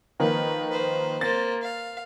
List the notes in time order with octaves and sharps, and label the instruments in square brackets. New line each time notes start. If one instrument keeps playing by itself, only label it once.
[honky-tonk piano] D#3 F3 A#3 [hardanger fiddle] B4
[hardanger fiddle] B4 C5
[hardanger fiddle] A#3 C5 [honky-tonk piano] A6 A#6
[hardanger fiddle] F5